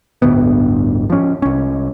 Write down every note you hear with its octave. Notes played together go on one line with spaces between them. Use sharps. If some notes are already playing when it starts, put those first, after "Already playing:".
G1 D2 A2 B3
F3 C#4
C2 C#4